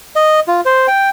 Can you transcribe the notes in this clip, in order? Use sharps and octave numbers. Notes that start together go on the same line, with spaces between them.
D#5
F4
C5
G5